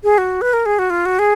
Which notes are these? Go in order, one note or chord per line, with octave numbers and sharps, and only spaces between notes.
G#4
F#4
B4
A#4
G#4
F#4
F4
F#4
G#4